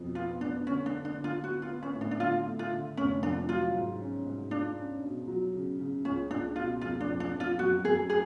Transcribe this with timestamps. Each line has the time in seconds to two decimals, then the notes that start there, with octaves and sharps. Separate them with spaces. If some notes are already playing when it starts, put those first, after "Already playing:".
Already playing: F2 B2
0.15 B3 F4
0.41 B3 D4
0.66 D3 C#4
0.86 D4
0.92 D3
1.05 D4
1.18 D3
1.24 F4
1.44 B3 F#4
1.62 F4
1.69 B3
1.83 C#4
1.95 A2
2.01 D4
2.11 D4
2.20 D3 F4
2.46 A3
2.59 F4
2.71 D3
2.97 F1 C#4
3.23 F2 D4
3.48 F#3 F4
3.74 G#2
4.00 C#4
4.25 G#2
4.51 D4 F4
4.77 C#4
5.02 B2
5.28 F#3
5.54 C#3
5.79 C#3
6.05 C#2 C#4
6.30 C#2 D4
6.56 B2 F4
6.81 F2 F4
7.01 D4
7.07 F2
7.20 D4
7.33 F2
7.40 F4
7.59 F#2 F#4
7.84 F#2 G#4
8.10 G#4